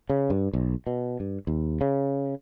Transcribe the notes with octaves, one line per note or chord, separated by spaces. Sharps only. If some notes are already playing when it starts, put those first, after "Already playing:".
C#3
G2
B1
B2
G2
D#2
C#3